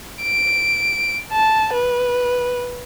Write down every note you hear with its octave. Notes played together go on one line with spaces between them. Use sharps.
D7
A5
B4